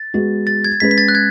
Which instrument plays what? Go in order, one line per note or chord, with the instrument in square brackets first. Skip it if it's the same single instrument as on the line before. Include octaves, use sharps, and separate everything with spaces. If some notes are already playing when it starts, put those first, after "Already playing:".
Already playing: [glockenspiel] A6
[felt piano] G#3 B3 F#4
[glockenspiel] A6
G#6
[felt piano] G#3 C#4 G#4 B4 [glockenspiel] B6
[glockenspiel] B6
A6
F#6
G#6